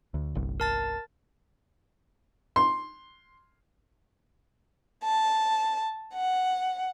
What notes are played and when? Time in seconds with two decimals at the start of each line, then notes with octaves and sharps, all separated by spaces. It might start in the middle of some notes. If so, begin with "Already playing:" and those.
0.14 D2
0.35 G1 C2
0.60 A#4 A5 A6
2.56 C6
5.05 A5
6.15 F#5